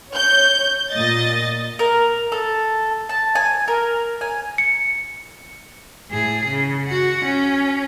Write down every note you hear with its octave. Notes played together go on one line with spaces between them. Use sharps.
C#5 G6
A#2 D#5 A6
A#4
A4
A5
G#5
A#4
G#5
C#7
A2 G#4
C#3
F#4 F#5
C#4